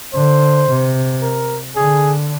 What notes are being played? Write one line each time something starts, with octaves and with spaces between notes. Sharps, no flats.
D3 C5
C3
A#4
D3 G#4